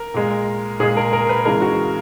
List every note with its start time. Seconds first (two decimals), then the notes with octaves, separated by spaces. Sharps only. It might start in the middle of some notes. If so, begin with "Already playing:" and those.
Already playing: A#4
0.14 A#2 G#3
0.80 A#2 G#3 G#4
0.97 A#4
1.13 A#4
1.29 B4
1.45 C#3 E3 G#3 A#4
1.62 F#4